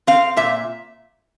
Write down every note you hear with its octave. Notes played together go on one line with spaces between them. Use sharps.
C4 F5
A#2 E5